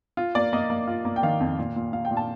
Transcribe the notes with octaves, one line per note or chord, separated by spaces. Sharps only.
F4
A#3 D5
A#3 D#5
A#3
F4
A#3
G5
D#3 F5
F2
A#2
A#2
A#2 F5
G5
A#2
A5